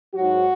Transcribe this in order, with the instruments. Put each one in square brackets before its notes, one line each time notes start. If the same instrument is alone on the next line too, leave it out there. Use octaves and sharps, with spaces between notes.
[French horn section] G#2 F#3 F#4